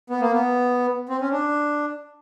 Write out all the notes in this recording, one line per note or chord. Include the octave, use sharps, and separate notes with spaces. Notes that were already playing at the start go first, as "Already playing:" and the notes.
B3
A#3
B3
C4
C#4
D4